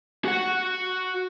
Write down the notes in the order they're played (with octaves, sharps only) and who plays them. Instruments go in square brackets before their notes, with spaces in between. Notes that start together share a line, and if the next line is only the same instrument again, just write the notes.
[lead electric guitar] F#4 F#5